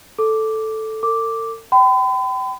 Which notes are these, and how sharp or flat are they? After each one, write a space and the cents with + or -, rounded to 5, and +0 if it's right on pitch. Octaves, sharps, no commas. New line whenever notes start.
A4 +0 D6 +0
A4 +45 D6 +0
G5 -30 B5 +40